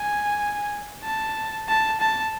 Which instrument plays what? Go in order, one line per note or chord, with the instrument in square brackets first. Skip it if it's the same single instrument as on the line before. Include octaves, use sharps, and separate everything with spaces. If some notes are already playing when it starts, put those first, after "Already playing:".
Already playing: [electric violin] G#5
A5
A5
A5